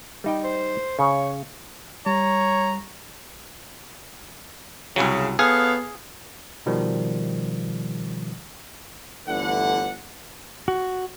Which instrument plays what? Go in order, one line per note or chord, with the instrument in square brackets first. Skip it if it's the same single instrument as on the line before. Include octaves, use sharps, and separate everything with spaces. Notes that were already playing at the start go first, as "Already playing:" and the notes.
[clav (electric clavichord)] G3 D#4 G5
[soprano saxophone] C5
[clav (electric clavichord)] C#3 [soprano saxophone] C#5
[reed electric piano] G3 [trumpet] C#5 [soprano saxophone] A#5
[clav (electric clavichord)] C2 F#3 [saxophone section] C#3
[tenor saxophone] B3 [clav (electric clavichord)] G#4 [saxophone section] A4 C#5 F5
[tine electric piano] B2 D#3 F3 G3
[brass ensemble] G1 D3 E3 A3 F#5
[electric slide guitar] F#4